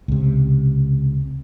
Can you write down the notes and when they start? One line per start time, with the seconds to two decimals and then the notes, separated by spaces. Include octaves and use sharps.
0.08 C#2 C3